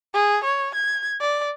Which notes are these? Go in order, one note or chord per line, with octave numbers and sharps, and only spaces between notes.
G#4
C#5
G#6
D5